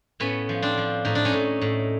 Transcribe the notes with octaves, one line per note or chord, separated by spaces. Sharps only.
A2 B3 C#4
F3
C4 D4
F3
A2 D#4
D4
C#4 D#4
A2
A2